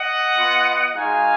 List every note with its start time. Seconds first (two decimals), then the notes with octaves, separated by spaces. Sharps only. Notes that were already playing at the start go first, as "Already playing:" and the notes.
Already playing: D#5 F#5
0.36 B3 F4
0.95 G#3 D#4 F#4 F5 G#5